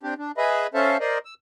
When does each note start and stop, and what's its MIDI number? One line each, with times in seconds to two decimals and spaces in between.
0.03 0.14 60
0.03 0.14 62
0.03 0.14 67
0.18 0.32 62
0.38 0.67 68
0.38 0.67 71
0.38 0.67 75
0.38 0.67 76
0.38 0.67 83
0.74 0.97 61
0.74 0.97 69
0.74 0.97 72
0.74 0.97 76
0.74 0.97 77
0.74 0.97 81
1.00 1.18 70
1.00 1.18 72
1.00 1.18 74
1.00 1.18 75
1.25 1.34 88